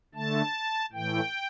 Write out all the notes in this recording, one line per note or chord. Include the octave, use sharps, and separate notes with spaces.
D3 A3 A5
A2 E3 A3 G5